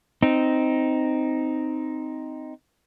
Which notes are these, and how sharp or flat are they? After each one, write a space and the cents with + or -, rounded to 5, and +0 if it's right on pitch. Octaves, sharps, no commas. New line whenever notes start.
C4 -10 D#4 +0